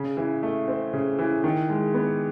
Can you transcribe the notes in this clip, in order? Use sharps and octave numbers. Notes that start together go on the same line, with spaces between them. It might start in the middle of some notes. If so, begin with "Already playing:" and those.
Already playing: C#3
E3
A3
C4
C#3
E3
D#3
G#3
B3